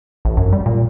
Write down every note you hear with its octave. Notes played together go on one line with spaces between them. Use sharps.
A1
F#2
G3
A#2